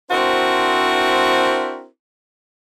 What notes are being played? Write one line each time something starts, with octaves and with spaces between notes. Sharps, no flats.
C4 D4 E4 F#4 A#4 C5